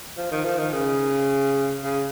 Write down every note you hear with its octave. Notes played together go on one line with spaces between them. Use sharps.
F3
D#3
F3
D#3
C#3
C#3